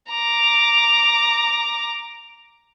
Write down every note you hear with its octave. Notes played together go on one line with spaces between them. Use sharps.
A#5 D6